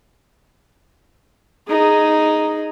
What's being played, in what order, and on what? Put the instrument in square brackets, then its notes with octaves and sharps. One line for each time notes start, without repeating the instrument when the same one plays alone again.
[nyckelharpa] D#4 G#4